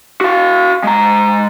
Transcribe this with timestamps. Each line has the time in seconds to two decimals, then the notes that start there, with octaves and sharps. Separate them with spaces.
0.21 F#4 F5
0.84 G#3 A#5